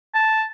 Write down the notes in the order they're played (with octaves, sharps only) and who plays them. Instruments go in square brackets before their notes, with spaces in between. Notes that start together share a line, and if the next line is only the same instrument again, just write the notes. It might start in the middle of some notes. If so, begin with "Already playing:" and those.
[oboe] A5